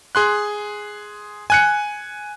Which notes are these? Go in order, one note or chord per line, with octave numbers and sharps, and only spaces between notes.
G#4 C6 F#6
G#5 F#6 C#7